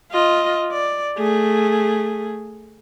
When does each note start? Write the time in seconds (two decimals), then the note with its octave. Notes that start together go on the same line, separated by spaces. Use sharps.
0.12 F4 D#5
0.71 D5
1.18 A3 G#4